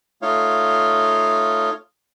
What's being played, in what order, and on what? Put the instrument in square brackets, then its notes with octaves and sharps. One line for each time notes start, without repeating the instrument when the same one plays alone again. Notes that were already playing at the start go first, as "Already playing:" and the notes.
[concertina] A3 D#4 F4 C#5 F5